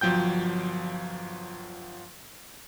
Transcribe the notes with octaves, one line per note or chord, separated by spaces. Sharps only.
G1 F3 F#3 G5 G6